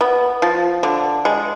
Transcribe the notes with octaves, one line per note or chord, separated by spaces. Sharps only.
B3
F3
D3
G#3